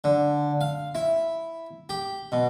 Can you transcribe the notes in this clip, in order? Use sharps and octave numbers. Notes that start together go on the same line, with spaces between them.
D3
F5
E4
G4
B2